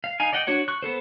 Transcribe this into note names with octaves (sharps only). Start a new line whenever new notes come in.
F5
D#4 F5 G#5
D5 D#5 F#5 G5
D4 F#4 C#5 F#5
C#6 F#6
B3 A4 C5